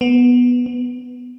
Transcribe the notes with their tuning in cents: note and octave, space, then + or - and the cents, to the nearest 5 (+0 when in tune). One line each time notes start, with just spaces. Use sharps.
B3 -5
B3 +15